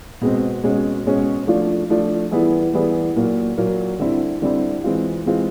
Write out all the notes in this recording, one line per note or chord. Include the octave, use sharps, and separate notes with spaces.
B2 G#3 C4
B2 G#3 C#4 F#4
B2 G#3 C#4 F#4
F3 A3 D4 F4
F3 A3 D4 F4
E3 G3 B3 E4 G#4
E3 G3 B3 E4 G#4
A#2 F#3 A#3
A#2 F#3 A#3
D3 G3 C4 E4
D3 G3 C4 E4
E3 G#3 C4 F4
E3 G#3 C4 F4